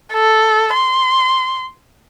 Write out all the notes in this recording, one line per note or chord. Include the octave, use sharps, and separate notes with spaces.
A4
C6